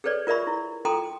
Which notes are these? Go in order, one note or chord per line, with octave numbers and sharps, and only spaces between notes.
G#4 A4 B4 C#5 D5
F4 A#4 D5 E5 B5 C#6
E4
F4 A4 G5 A#5 C6 D#6